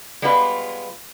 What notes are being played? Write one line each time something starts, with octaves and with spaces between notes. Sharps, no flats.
G3 G#3 B3 F4 B4 C#5